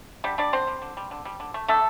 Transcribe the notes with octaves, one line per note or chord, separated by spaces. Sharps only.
D3 G3 G4
G3 D4 D5
D3 C4 C5
G3
D3
G3
D3
G3
D3
A3
D3 A3 A4